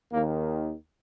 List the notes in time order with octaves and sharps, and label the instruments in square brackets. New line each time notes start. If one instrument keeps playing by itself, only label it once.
[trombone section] D#2 D#3 A#3